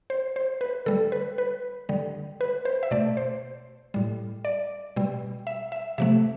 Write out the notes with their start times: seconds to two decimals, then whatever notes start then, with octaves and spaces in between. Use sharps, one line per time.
0.10 C5
0.36 C5
0.61 B4
0.86 D3 G3 A4
1.12 B4
1.38 B4
1.89 D3 G3
2.41 B4
2.65 C5
2.83 E5
2.91 B2 A3 D5
3.17 C5
3.94 A2 G3
4.45 D5
4.96 B2 G3
5.47 E5
5.72 E5
5.98 C3 F3 A3 E5